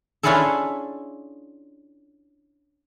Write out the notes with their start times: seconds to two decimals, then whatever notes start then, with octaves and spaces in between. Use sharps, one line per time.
0.23 C#4 D4 E4 F4 G#4 A4